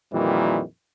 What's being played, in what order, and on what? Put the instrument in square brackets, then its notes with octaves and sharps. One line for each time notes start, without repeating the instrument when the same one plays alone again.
[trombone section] F2 A#2 D#3 E3 G3